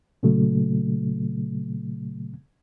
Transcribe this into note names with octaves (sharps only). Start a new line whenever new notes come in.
A#2 C#3 F#3 A3